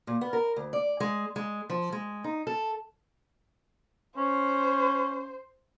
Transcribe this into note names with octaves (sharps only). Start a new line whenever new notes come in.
A#2
B3
A#4
D2
D5
G#3
G#3
F3
G#3
D#4
A4
C#4 C5